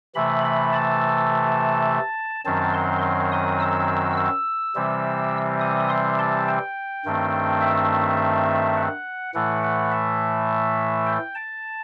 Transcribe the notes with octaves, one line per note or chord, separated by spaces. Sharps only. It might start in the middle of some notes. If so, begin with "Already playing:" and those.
C3 E3 A3 B5
B5
A5
F#2 D#3 F#3 C4 A5
C6
C6
D#6
E6
E6
C3 E3 G3 C4
D#6
C6
A5
G5
G2 D#3 A3 C4
E5
F#5
A2 E3 A3 F#5
F#5
E5
G5
A5